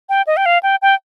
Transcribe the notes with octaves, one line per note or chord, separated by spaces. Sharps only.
G5
D#5
G5
F5
G5
G5